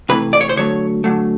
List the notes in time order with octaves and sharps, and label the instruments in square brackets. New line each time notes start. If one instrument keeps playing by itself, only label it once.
[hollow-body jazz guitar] C3 E3 A3 B4
D5
C#5
C5
D3 F#3 A3 C#5
D3 F#3 A3